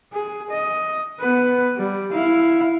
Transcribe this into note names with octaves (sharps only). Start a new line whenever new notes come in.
G#4
D#5
B3 B4
G3
E4 F5